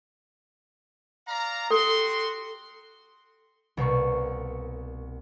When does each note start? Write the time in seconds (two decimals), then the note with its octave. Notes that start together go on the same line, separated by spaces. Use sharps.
1.27 D5 F5 A#5
1.70 F#4 G4 A4 C6
3.77 C2 B2 A#3 C#6